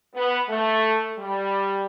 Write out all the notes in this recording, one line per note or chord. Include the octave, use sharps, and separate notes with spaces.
B3
A3
G3